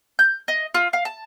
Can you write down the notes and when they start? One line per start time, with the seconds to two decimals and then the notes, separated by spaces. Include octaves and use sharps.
0.19 G6
0.48 D#5
0.74 F4
0.93 F5
1.05 A5